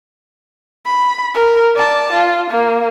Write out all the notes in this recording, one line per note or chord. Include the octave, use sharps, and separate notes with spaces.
B5
A#4
D5 A5
F4
A#3